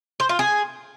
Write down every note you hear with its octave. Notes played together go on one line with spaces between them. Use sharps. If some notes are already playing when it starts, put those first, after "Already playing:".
C5
F4
G#4